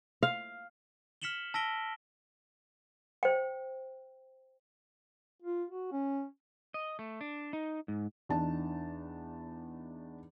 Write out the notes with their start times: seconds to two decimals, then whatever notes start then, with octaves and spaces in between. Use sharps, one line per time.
0.23 F5
1.22 F6 B6 C#7 E7 F#7 G7
1.54 A5 E6 A#6 B6 D7 G7
3.23 C5 G5
5.42 F4
5.71 F#4
5.92 C#4
6.74 D#5
6.99 A3
7.21 D4
7.53 D#4
7.88 G#2
8.29 E2 D4 D#4 A5